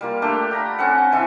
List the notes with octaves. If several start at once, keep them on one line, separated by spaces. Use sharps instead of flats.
G3 A#3 F4
A3 D4 G4
G5 A#5 B5
C4 C#4 A4 F#5
E3 E4